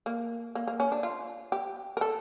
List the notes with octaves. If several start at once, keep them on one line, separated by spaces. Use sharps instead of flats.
A#3
A#3
A#3
C#4
D4
F4
G4
A#4
A4